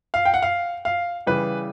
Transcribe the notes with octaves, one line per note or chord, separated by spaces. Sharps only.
F5
G5
F#5
F5
F5
C#3 E3 G3 B4